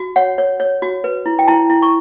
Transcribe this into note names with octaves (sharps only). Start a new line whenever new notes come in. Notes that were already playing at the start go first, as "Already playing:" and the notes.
Already playing: F#4
C#5 F#5
C#5
C#5
F#4
B4
E4
G5
E4 A5
E4
C#6